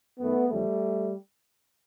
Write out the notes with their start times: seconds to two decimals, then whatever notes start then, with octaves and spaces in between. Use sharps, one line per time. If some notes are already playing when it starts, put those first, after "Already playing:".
0.19 F#2 D#3 A3 B3
0.50 E2 C#3 F3 G3 A3